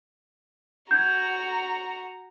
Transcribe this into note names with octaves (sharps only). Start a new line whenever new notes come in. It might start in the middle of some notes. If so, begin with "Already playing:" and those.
F#4 A#5 G6 G#6